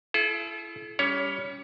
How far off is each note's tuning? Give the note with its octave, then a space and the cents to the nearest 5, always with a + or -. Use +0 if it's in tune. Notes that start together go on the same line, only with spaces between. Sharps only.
E4 +35 A4 -40
G3 +0 C#4 +25 C#5 +15